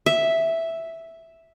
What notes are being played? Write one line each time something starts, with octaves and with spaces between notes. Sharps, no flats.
E5